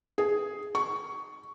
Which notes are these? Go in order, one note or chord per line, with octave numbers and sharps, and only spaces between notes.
G#4
C#6